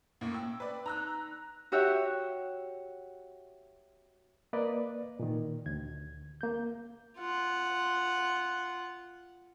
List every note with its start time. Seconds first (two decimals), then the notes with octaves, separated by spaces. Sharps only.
0.21 A2 A#3 C#4
0.34 G5 E6
0.60 B4 D5
0.86 D#4 A#5 E6 F#6
1.72 F#4 G4 C#5 E5 F#5
4.53 A#3 B4 D5 D#5
5.20 A#2 D#3
5.66 D2 G#6
6.41 A#3 G6
7.18 F4 F#5